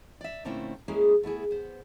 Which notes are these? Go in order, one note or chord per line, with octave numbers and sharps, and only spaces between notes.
D5 E5
A#2 D3 A3 C4 C#4 E4
G#3 A#3 C#4 E4 G#4
A3 B3 E4 G#4
B3 C5